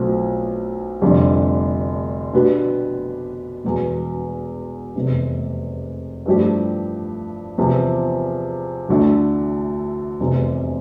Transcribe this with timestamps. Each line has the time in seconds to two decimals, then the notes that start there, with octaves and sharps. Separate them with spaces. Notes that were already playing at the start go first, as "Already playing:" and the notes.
Already playing: B1 B2 A3 C4 F4
1.02 F1 F2 D3 G3
2.33 B2 B3 D4 G4
3.64 E1 E2 B2
4.96 F1 E2 C3
6.26 G2 F3 A3 E4 G4
7.58 E2 C3 F3
8.89 D2 D3 A3 E4
10.20 F1 E2 C3